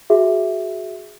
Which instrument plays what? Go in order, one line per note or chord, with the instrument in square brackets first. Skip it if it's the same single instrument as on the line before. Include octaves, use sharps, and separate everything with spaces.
[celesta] F#4 G#4 E5